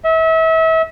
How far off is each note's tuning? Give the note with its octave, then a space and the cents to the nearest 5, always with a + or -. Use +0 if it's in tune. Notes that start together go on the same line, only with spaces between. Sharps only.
E5 -35